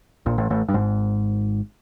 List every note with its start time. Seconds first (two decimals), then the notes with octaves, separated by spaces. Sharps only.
0.26 A#1 A#2
0.38 A1 A2
0.50 A1 A2
0.69 G2
0.74 G#1 G#2